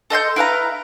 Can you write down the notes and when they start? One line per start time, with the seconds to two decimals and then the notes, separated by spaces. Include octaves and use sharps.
0.10 A4 D#5 C6 G6
0.36 E4 B4 F5 A#5